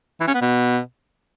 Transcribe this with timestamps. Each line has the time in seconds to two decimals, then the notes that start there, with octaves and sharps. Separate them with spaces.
0.20 E3
0.27 C#4
0.34 B3
0.41 B2